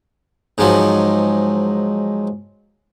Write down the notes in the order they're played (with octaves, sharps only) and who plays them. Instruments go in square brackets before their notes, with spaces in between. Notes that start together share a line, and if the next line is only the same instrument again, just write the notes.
[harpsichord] G#2 F3 F#3